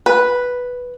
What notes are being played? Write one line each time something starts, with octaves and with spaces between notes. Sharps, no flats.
B4